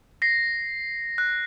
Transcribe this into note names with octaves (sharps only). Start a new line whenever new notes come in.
A#6 C7
F#6